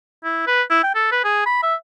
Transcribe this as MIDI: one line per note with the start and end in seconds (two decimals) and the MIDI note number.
0.24 0.47 64
0.47 0.62 71
0.70 0.79 64
0.83 0.93 79
0.95 1.07 69
1.12 1.24 71
1.24 1.45 68
1.46 1.62 83
1.63 1.75 76